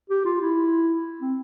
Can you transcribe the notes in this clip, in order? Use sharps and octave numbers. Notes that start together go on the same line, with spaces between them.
G4
F4
E4
C4